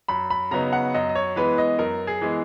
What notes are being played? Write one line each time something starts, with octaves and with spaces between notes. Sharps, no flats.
F#2 B5
B5
C#3 F#3 B3 D#4 A#5
F#5
F#2 D#5
D#5
C#5
E3 G#3 B3 B4
D#5
F#2 A#4
G#4
E3 G#3 B3